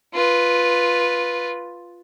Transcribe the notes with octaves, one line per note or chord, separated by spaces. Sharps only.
F4 B4